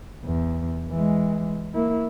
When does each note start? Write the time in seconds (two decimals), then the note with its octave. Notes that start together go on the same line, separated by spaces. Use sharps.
0.24 E2
0.91 E3 G#3
1.74 A#3 E4